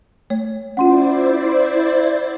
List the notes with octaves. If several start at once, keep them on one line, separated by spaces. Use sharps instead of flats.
A3 C#5
C#4 E4 F4 C5 D5 F#5 C6